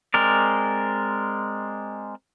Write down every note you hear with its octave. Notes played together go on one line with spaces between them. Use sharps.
G#3 C4 A#4 D5